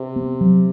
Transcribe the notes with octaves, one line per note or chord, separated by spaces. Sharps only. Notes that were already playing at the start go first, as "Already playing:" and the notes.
Already playing: C3
B3
F#3